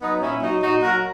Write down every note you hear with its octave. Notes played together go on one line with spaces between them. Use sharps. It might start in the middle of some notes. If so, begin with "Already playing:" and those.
F#3 B3 D#4
A#2 C#4 E4
F#3 D#4 F#4
A#2 D#4 F#4
F#3 F#4 A#4